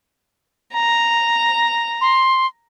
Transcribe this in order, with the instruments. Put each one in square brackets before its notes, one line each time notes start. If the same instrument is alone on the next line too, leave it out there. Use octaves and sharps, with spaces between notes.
[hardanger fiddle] A#5
[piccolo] C6